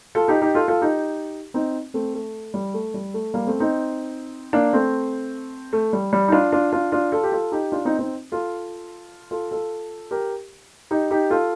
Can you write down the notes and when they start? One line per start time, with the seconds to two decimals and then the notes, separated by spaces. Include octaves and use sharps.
0.15 F4 A4
0.28 D#4 G4
0.42 D#4 G4
0.55 F4 A4
0.68 F4 A4
0.81 D#4 G4
1.54 C4 D#4
1.94 A3 C4
2.15 A3
2.54 G3
2.74 A3
2.94 G3
3.14 A3
3.34 G3 A#3
3.47 A3 C4
3.60 C4 D#4
4.53 A#3 D4
4.73 A3 C4
5.73 A3
5.93 G3
6.13 G3
6.28 D#4
6.32 D4 F4
6.52 D4 F4
6.72 D4 F4
6.92 D4 F4
7.12 F4 A4
7.23 G4
7.32 F4 A4
7.52 D#4 G4
7.72 D4 F4
7.85 C4 D#4
7.99 C4 D#4
8.32 F4 A4
9.31 F4 A4
9.51 F4 A4
10.11 G4 A#4
10.91 D#4 G4
11.11 D#4 G4
11.30 F4 A4